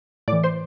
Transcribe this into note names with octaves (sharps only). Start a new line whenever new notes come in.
A2 E3 D5 D6
C5 C6